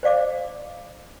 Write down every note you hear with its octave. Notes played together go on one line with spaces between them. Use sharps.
C5 D5 F5 D6